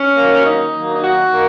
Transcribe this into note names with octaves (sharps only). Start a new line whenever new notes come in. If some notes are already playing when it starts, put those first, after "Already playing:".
Already playing: C#4
D#3 F#3 A#3
D#4
D#3 F#3 A#3
D#4
F#4
D#3 A#3